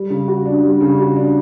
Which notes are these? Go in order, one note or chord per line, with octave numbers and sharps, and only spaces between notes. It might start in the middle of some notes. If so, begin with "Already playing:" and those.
Already playing: G3
C#3
F#4
D4
G3
C#3
F#4
D4